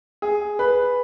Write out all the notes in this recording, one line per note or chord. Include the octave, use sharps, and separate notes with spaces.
G#4
B4